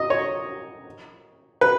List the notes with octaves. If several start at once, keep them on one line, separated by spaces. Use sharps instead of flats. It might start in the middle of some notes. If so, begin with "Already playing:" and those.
Already playing: D#5
C#5
B4